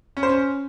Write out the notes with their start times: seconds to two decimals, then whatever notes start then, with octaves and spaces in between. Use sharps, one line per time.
0.17 C#4
0.23 C5
0.29 C#4